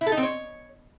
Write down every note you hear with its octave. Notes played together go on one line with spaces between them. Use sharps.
E4
A4
D#4
C4
C#5